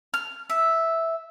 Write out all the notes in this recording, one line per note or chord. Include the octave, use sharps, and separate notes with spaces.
F6
E5